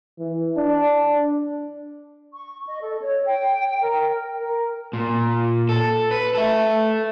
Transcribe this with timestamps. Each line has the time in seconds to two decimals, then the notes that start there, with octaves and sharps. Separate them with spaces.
0.18 E3
0.56 D4
2.33 C#6
2.67 D#5
2.81 A4
3.02 C#5
3.26 G5
3.83 A#4
4.36 A#4
4.93 A#2
5.69 A4
6.11 B4
6.34 A4 E5